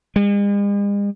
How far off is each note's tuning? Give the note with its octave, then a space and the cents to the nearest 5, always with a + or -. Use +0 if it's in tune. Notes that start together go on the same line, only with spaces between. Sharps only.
G#3 -45